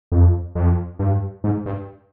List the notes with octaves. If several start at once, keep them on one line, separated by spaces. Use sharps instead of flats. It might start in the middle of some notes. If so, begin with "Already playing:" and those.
F2
F2
G2
G#2
G2